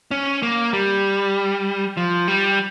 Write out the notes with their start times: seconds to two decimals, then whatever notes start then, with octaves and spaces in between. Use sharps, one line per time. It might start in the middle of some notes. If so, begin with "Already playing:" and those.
0.11 C#4
0.43 A#3
0.73 G3
1.97 F3
2.28 G3